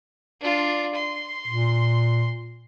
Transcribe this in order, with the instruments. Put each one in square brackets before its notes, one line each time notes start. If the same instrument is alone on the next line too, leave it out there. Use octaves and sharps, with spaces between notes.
[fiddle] D4 F4
C6
[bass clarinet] A#2